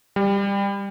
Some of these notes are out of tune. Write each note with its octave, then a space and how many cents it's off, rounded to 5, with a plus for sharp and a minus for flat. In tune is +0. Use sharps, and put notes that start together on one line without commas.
G3 +20